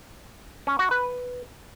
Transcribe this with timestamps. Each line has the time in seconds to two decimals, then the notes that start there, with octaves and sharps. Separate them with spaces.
0.67 C#4
0.79 F#4
0.91 B4